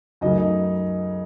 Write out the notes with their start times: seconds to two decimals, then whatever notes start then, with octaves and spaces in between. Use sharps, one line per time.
0.21 F#2 C#3 F#3 A3 D#4 D#5
0.38 D#4 D#5